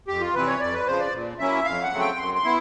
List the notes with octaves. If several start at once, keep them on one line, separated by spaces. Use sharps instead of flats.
F2 G4
F4
C3 E3 G3 C4 B4
C#5
F2 D5
B4
C#3 F3 C5
D5
A#2
F#3 A#3 C#4 E4 E5
F2 F5
F#5
C#3 F#3 A3 C4
G5
F#2 C6
C6
B3 E4